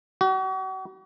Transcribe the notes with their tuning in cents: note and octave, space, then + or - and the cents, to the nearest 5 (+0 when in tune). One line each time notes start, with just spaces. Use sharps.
F#4 +40